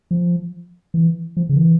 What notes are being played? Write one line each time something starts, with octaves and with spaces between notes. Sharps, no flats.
F3
E3
F3
C#3
E3